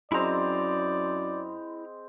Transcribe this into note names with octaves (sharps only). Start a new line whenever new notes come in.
F#2 G#3 C4 E4 D5 A#5